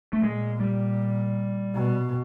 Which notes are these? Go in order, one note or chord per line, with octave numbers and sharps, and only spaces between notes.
A3
A#2 G#3
G3
B2